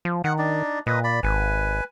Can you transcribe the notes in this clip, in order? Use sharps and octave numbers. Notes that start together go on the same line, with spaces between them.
F3
D#3 F#5
D4 D#4 D5
A#2 B4 D#5
D5 B5
G#1 B4 G#5